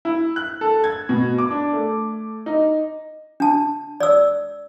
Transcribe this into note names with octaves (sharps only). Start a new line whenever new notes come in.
E4
F#6
A4
G#6
B2
D6
D4
A3
D#4
D4 A5
D5 E6